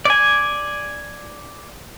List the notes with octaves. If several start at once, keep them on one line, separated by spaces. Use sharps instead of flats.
D5 G#5